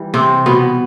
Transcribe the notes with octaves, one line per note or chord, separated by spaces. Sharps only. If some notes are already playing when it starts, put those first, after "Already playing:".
Already playing: E3 G3
C3 C4
B2 B3